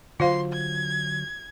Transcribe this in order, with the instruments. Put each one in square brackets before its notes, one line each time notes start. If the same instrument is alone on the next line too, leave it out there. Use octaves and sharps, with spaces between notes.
[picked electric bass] D3 F#3 [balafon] F4 C5 F5 [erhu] C6
[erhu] G#6